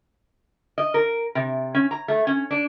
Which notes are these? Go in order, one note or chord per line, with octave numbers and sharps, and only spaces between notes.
D#5
A#4
C3
C#4
A#5
A3
C#4
D4